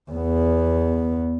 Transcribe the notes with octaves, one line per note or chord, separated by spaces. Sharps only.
E2 B3